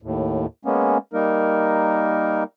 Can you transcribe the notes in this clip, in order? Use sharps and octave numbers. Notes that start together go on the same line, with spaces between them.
D#2 A2
G#3 A#3 B3 C#4
G3 A#3 D#4 A#4